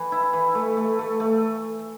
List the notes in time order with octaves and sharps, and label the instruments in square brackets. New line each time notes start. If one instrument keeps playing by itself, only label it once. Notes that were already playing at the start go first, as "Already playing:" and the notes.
Already playing: [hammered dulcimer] E3
E4
E3
A3
A3
A3
A3